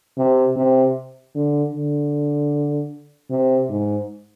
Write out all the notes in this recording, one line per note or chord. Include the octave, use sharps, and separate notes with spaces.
C3
C3
D3
D3
C3
G#2